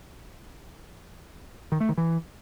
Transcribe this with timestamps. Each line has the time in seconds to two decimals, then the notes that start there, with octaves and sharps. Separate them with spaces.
1.72 D#3
1.80 A3
1.89 D#3
1.98 E3